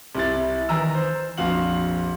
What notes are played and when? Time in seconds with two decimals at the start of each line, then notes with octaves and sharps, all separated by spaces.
0.15 C2 E4 A6
0.69 D#3 E3 A#5 E6
0.94 C5
1.38 A#1 F2 F#4 F5 F#7